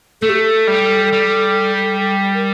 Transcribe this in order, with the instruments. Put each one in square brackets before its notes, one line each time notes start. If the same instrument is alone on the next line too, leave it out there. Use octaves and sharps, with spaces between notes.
[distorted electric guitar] A3 [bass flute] A4
[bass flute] G4
A4
[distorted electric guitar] G3
G3
[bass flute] A#4